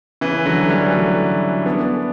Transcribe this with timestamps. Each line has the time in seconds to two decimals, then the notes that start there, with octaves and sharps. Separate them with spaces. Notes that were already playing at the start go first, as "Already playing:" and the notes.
0.21 C#3 E3
0.46 D3 F#3
0.69 E3 G3
0.93 F#3 A3
1.66 B3 D4